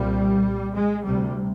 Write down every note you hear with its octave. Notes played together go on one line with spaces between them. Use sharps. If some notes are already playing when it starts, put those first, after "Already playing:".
Already playing: C2 A#2 G3
G#3
D2 C3 G3